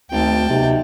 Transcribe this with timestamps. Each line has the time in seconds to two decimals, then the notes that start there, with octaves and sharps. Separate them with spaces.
0.11 G#1 D2 G5 A5
0.49 B1 C3